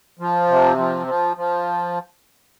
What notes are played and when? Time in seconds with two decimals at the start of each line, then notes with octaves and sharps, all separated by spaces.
0.19 F3
0.48 C3
0.77 F3
1.07 F3
1.37 F3